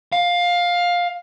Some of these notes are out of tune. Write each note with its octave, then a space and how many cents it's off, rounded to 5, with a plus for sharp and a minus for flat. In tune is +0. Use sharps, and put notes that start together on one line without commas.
F5 +15